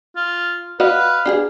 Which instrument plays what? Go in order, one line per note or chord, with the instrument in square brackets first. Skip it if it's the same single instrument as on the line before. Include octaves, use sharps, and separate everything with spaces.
[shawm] F4
[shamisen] F#4 D5 D#5 [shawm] B4 [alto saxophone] F5
[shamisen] D4 G4 G#4